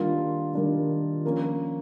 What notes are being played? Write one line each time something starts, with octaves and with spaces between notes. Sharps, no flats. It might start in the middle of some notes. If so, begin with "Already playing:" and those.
Already playing: D#3 G3 A#3 D4 F4
D#3 G3 A#3 D4 F4
F3 A#3 C#4